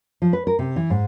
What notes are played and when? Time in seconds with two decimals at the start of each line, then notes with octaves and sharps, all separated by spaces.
0.22 F3
0.33 B4
0.47 A#4
0.59 C3
0.76 E3
0.90 G#2